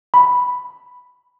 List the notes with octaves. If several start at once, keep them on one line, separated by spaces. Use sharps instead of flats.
B5